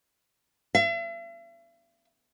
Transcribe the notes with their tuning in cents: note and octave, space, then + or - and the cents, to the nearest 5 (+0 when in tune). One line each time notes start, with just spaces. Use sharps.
E5 +45